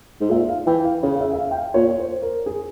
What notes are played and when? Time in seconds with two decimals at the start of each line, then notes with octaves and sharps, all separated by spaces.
0.21 G#2
0.30 A#2 E5
0.49 F5
0.66 E3 G5
0.84 F5
1.03 C#3 C#5
1.15 F5
1.21 E5
1.33 E5
1.38 F5
1.51 G5
1.57 F5
1.74 A#2 C#5
1.89 C#5
1.99 C5
2.22 A#4
2.46 G#4